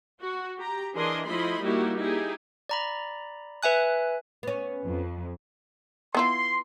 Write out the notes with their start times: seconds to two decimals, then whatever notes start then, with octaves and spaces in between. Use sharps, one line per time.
0.21 F#4
0.58 G4 A#5
0.96 E3 D4 G#4 A#4 D#5 C6
1.26 F3 A3 E4 D#5 B5 C6
1.62 G3 A#3 D#4 E4 F#4 G4
1.98 D#4 E4 G4 G#4
2.69 D5 A#5 B5
3.63 B4 E5 G#5 F#6
4.43 B3 C#4
4.84 F2
6.15 B3 E4 F4 C6